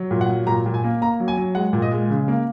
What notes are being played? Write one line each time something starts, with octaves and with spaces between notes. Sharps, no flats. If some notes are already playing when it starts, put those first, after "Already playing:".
Already playing: F#3
A#2
F#5
F#3
A#2 A#5
A#2
G#5
A#3
A#3 A#5
F#3
G#5
F#3
G#3 F#5
A#2
D#5
G#3
C#3
A#3